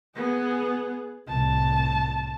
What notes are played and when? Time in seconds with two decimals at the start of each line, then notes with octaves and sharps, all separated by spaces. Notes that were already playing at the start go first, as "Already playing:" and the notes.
0.16 B3 G#4
1.29 C2 A2 A5